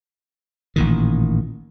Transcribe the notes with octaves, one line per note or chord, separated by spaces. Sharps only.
A1 A#2 D#3